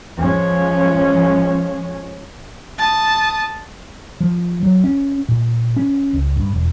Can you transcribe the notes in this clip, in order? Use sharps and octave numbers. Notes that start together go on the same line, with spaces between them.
F3 G#3 C#4
A5 D#6
F3
F#3
C#4
A#2
C#4
C#2
G2
E1